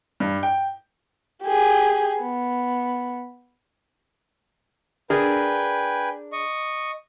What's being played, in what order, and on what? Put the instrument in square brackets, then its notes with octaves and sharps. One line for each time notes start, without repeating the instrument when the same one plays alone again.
[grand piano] G2
G5
[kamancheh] G4 G#4
B3
[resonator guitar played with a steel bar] D4 G#4 A#4 [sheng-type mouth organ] B4 G5 G#5
[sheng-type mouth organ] D#5 C#6